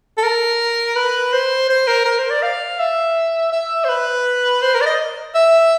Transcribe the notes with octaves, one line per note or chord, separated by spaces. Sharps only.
A4
A#4
B4
C5
C5
A#4
A#4
C5
D5
F5
E5
E5
C5
B4
C5
A#4
D5
D#5
E5